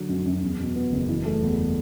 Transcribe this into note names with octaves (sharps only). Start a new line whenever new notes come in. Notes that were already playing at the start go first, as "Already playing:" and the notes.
Already playing: D3 F#3
F#2
F#2
E2
B2
B3
F#1
E3
A3
E2